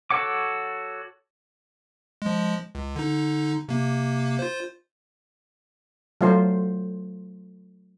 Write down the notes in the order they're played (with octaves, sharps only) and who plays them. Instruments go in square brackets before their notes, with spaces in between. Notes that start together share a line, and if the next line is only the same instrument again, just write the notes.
[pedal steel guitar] F#4 A4 C#5 F#5 D6
[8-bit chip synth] F3 G#3
C#2
D3 D#4
C3 A#3
F4 C5
[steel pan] F#3 A3 F4 C5